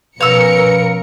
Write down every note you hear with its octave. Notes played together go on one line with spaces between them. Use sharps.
B2 F3 C#4 A#4 B4 F5 E6 C#7